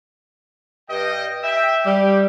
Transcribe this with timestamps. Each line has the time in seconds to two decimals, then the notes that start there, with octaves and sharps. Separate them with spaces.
0.89 G2 D#5 G5
1.44 E5 G5
1.86 G3 G4